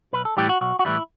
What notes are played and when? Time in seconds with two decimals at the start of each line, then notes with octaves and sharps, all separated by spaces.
0.13 B1 B4
0.25 A4
0.37 A2 E3 G3 G4
0.49 F#4
0.61 B1 F#4
0.79 F#4
0.85 A2 E3 G3 E4